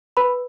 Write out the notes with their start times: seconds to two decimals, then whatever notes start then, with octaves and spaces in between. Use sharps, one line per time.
0.17 B4 B5